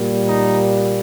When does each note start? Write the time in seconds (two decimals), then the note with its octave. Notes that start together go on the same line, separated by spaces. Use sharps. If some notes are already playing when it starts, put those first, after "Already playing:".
Already playing: A#2 G3 A#3
0.28 D#4